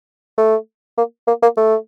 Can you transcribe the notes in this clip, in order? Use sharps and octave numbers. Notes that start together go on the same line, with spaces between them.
A3
A#3
A#3
A#3
A3